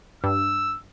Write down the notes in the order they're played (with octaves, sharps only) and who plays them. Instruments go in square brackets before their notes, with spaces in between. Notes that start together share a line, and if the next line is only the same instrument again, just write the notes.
[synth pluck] G2 [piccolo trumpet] E6